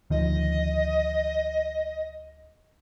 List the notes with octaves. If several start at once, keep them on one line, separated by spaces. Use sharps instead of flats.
D2 D#3 F3 D#5